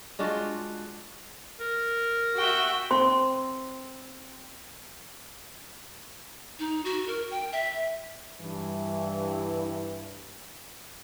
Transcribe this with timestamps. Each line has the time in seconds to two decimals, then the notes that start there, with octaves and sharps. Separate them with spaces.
0.19 G#3 D4 F4 F#4
1.60 A#4
2.37 F#4 E5 G5
2.91 C4 C6
6.59 D#4
6.85 F#4
7.07 A#4
7.31 G5
7.52 E5
8.40 G2 E3